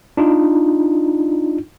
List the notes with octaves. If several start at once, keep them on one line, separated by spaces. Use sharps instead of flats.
D4 D#4 F4